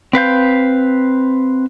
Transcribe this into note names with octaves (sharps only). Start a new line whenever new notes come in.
C4 B4 F5 G6